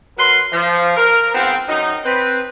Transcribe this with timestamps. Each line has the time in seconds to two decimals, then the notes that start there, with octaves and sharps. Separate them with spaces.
0.18 F#3 A#4 B4 C6
0.53 F3
0.97 A#4
1.34 G#2 F3 B3 C4
1.68 F#2 D#4
2.05 C4 B4